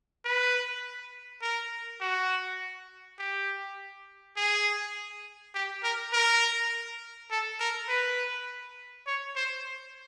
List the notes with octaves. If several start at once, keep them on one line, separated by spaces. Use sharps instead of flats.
B4
A#4
F#4
G4
G#4
G4
A#4
A#4
A4
A#4
B4
C#5
C5